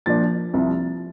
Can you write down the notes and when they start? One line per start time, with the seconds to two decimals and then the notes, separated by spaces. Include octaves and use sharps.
0.06 A#2 F3 A#3 D4 A6
0.53 C2 C3 F3